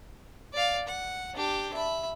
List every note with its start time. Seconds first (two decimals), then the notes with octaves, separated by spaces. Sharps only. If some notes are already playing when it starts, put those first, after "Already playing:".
0.54 D5 F5
0.88 F#5
1.34 D4 G4
1.74 E5 B5